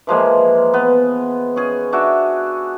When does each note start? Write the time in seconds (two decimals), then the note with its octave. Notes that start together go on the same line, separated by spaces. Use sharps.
0.07 E3 F3 G#3 A#3
0.74 B3
1.56 C#4 G#4
1.93 D4 F#4 E5